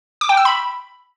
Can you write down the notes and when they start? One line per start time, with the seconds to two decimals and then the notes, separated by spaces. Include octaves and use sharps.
0.21 D6
0.29 G5
0.37 E6
0.45 B5